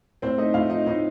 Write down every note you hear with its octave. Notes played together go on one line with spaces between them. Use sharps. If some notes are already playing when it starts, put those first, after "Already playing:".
A2 C4 C5
A3 D#4 D#5
A2 F4 F5
F3 D#4 D#5
A2 D#4 D#5